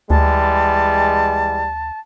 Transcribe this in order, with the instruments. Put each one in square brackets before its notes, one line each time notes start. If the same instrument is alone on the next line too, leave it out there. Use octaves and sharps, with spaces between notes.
[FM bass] D2 [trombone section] E3 G3 G#3 [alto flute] A5